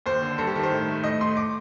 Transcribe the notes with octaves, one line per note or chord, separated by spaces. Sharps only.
D#2 C5
D3
G2 A4
G4
D#3 A4
C5
A2
A3
A2 D#5
A3 C6
D6